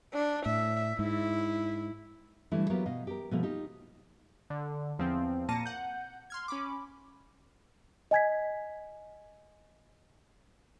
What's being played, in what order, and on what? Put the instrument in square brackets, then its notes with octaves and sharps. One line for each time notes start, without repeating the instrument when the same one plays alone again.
[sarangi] D4
[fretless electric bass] A2 [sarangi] E5
[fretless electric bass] G#2 [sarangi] E4
[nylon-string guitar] D3 E3 G3 A3 E4
F#3 B3 F4 G4 A#4 C#5
B2 D#5 F5
G4 A#4
B2 E3 F3 A3 A#3
D#4 F4 G4
[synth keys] D3
E2 F3 C4
A#2 A#3 A5 A#6 C#7 D#7
F#5 G6
C6 F6 G#6
C#4 B5 D6
[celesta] D#5 G#5 G#6 B6